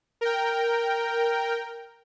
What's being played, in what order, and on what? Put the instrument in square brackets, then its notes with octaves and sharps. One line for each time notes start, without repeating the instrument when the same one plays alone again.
[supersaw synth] A#4 G5